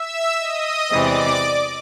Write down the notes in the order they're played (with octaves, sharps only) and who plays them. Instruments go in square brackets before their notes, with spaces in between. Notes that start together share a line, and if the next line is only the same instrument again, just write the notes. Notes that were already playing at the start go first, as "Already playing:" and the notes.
Already playing: [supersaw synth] E5 E6
D#5 D#6
[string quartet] E2 C3 E3 G#3 C4 [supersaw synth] D5 D6